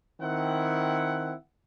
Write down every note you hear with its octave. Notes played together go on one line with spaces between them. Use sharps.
D#3 C4 E4 F#5